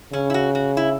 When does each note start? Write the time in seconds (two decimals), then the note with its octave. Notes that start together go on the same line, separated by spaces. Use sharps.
0.13 C#3 C#4
0.30 E4
0.34 F#4
0.55 F#4
0.77 E4